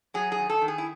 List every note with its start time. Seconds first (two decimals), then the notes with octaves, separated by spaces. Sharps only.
0.14 F#3 G#4
0.32 G#4
0.39 D#3
0.49 A4
0.61 D#3
0.68 G#4
0.78 E4